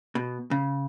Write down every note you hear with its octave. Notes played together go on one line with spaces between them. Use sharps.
B2
C#3